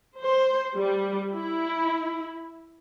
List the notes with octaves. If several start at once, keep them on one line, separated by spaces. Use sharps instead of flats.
C5
G3
E4